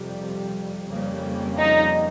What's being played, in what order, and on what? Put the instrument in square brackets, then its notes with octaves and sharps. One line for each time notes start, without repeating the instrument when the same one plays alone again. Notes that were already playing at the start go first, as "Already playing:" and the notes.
Already playing: [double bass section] F2 C3 G3
F2 C#3 G3 A#3
[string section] D#4